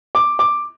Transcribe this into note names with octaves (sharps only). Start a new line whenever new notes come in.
D6
D6